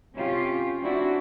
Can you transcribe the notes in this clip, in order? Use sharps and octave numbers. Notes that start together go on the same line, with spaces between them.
C3 C#4 F4 G4
C4 D4 E4 F#4